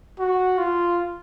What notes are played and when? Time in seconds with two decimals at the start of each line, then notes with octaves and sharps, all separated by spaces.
0.19 F#4
0.58 F4